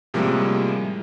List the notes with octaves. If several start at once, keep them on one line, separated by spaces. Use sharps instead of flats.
A2 C3 F3 G3 G#3 A#3